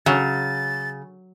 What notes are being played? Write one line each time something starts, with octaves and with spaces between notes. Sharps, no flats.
C#3 F#3 A6